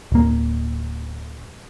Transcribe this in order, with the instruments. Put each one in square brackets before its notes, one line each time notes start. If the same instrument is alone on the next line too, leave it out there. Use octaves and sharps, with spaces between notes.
[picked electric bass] D1 A#3